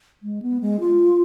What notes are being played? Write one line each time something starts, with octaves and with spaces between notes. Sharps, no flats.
G#3
B3
G#3
F4